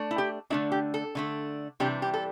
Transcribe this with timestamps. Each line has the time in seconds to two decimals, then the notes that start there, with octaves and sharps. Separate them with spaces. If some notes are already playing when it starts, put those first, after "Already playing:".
Already playing: A3 D4
0.11 E4
0.18 G4
0.50 D3 A3 D4 E4
0.72 G4
0.94 A4
1.15 D3 A3 D4
1.80 C3 E3 G3 D4 G4
2.02 G4
2.14 A4